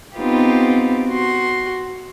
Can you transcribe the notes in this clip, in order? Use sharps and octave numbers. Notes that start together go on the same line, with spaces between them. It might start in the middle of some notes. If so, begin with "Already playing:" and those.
B3 C4 D#4 F4 G4
F#4 C6